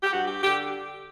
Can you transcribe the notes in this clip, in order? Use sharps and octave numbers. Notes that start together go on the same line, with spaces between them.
G4
G2 F#4
G4
D3 G4